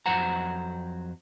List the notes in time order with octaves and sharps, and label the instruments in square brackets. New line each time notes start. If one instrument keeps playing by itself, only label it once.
[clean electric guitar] F2 F#3 C5 F#5 A#5